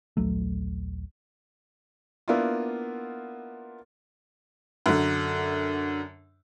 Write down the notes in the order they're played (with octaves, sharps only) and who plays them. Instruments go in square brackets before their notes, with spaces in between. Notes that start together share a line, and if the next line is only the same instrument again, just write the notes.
[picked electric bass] D#1 A#1 F#3 A3
[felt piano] A#3 B3 D4 E4 F4
[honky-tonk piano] F#2 D3